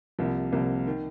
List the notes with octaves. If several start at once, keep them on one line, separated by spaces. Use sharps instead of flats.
C2 C3 F3 A#3
C2 C3 F3 A#3
D#3